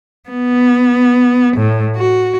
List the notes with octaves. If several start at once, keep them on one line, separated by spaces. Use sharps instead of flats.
B3
A2
F#4